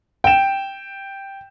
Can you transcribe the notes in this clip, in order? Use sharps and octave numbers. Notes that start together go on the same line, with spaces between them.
G5 E7